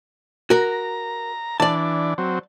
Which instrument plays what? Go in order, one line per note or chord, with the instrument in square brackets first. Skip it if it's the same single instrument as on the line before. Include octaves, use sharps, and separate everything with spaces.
[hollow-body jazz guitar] F#4 A#4 [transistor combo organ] A#5
[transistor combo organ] E3 D4 [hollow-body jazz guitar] D5 A5
[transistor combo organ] F#3 C4